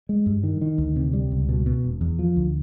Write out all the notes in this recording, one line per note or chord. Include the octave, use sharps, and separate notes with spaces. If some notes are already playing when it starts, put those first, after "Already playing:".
G#3
G2
D#3
D#3
D2
C3
G3
C#2
B2
B2
E1
E2
F3
D2